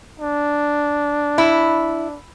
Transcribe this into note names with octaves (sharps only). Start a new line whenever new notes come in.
D4
E4